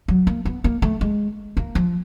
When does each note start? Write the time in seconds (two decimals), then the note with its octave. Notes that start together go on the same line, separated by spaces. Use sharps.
0.08 F#3
0.27 A#3
0.45 B3
0.64 A#3
0.82 A3
1.01 G#3
1.57 A#3
1.75 F3